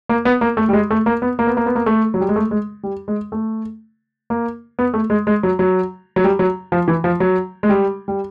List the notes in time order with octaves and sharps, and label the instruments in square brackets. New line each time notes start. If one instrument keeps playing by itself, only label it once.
[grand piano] A#3
B3
A#3
A3
G3
G#3
A3
A#3
B3
A#3
B3
A#3
B3
A#3
A3
F#3
G3
G#3
A3
G#3
G3
G#3
A3
A#3
B3
A3
G#3
G#3
F#3
F#3
F#3
G3
F#3
F3
E3
F3
F#3
G#3
G3
G3